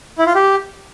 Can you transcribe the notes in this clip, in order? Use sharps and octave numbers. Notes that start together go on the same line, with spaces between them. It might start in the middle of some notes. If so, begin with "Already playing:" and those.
E4
F4
G4